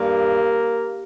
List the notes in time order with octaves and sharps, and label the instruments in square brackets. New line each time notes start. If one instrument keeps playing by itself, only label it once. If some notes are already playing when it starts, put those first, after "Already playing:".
Already playing: [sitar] G2 [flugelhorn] A#3